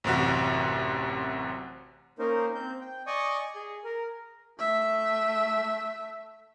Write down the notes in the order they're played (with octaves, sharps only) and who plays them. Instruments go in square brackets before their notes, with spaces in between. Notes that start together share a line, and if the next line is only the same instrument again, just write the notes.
[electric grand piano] A1 F#2 C3 F#4
[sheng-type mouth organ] A#3 C#4 D#4 A#4 C5
C4 G6
G5
D5 D#5 G#5 C#6 D#6
G#4
A#4
[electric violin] A3 E5